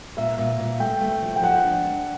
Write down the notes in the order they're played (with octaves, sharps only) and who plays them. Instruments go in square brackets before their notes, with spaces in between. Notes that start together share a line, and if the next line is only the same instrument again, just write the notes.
[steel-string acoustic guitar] A#2 [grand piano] E5
[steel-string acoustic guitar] A#2
A#2
[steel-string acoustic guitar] A3 [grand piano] G5
[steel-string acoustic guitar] A3
F3
[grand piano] G5
[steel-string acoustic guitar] F3 [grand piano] F#5
[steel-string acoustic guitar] D4
D4